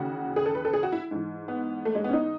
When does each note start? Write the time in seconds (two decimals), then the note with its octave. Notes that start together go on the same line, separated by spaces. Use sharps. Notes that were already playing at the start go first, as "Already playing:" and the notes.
Already playing: D#2 C#3 E3 F#4
0.36 G#4
0.46 A4
0.55 B4
0.65 A4
0.73 G#4
0.83 F#4
0.92 E4
1.11 G#2 E3
1.48 B3
1.85 A3
1.95 G#3
2.04 B3
2.09 C#4
2.13 D#4